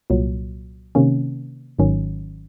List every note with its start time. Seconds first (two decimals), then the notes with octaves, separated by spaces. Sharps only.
0.10 C2 A#2 F#3
0.95 C3 D#3 A#3 C#4
1.79 G#1 G#2 D#3 F#3 C#4